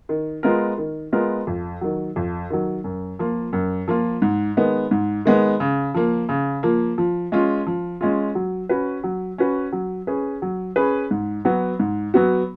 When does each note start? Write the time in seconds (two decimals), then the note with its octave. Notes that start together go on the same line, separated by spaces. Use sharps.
0.09 D#3
0.43 G#3 B3 F4 A#4
0.78 D#3
1.13 G#3 B3 F4 A#4
1.47 F2
1.81 D#3 F#3
2.16 F2
2.50 D#3 F#3
2.84 F#2
3.19 F3 A#3 F4
3.53 F#2
3.88 F3 A#3 F4
4.22 G#2
4.57 D#3 G#3 B3
4.91 G#2
5.25 D#3 G#3 B3
5.60 C#3
5.94 F3 A#3
6.29 C#3
6.63 F3 A#3
6.98 F3
7.32 G#3 C#4 F4
7.67 F3
8.01 G#3 C#4 F4
8.35 F#3
8.69 C#4 F#4 B4
9.04 F#3
9.38 C#4 F#4 B4
9.72 F#3
10.07 C#4 G#4 B4
10.42 F#3
10.76 C#4 G#4 B4
11.11 G#2
11.45 F#3 B3 F#4
11.80 G#2
12.14 F#3 B3 F#4